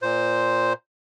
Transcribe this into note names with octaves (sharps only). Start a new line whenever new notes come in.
A#2 C5